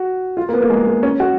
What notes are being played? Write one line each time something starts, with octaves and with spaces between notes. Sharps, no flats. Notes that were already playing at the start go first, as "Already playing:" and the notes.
Already playing: F#4
F4
A#3
B3
A#3
G#3
A#3
C#4
F#4